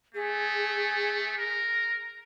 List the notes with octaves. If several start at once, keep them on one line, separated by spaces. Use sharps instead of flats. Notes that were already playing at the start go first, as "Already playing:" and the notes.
A3 G#4
A#4